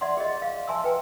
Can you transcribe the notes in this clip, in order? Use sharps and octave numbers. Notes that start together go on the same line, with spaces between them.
D5 E5 F#5 C6
G#4 D#5
F5
E5 G#5 A5 C6 E6
B4 G5 G#5